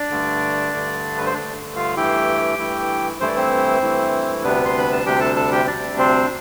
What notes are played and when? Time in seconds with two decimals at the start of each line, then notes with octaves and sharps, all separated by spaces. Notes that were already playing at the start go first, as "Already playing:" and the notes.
Already playing: D4 D5
0.11 G2 D3 A3
0.72 G2 D3 A3
1.17 B4
1.25 C5
1.34 G2 D3 A3 D4 D5
1.76 F4 F5
1.96 G2 E3 A3 E4 G4 G5
2.58 G2 E3 A3 E4
3.20 G2 E3 A3 E4 C5
3.28 D5
3.36 C4 C5
3.82 G2 E3 A3 E4
4.43 D2 C3 G3 B3 D4 B4
4.65 C6
4.78 B5
4.91 A5
5.06 D2 C3 G3 D4 G4 G5
5.20 A4 A5
5.36 A4 A5
5.52 G4 G5
5.67 D2 C3 G3 D4 D5
5.98 C4 C5